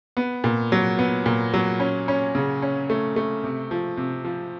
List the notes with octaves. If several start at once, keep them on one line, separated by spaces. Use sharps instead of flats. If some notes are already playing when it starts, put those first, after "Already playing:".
B3
A#2
F#3
B3
A#2
F#3
C#4
C#4
C#3
C#4
A3
A3
C3
F3
C3
F3